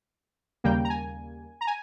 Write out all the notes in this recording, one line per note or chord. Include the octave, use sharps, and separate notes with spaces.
D#2 C#3 G3 A#3 G5
A#5
G#5
A#5
G#5